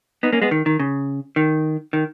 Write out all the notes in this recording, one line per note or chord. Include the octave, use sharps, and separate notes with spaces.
B3 D#4
A#3 C#4
G#3 B3
D#3
D#3
C#3
D#3
D#3